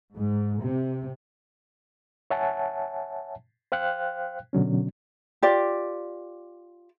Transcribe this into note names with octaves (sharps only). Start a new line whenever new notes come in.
G#2
C3
C#5 E5 F#5 G#5 A5
C5 F5 G5 F#6
B2 D3 F#3 C#4
F4 G4 D5